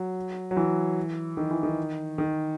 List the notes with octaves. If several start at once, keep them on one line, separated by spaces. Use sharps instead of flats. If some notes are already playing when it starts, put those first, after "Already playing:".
Already playing: F#3
F#3
E3
D#3
E3
D#3
D#3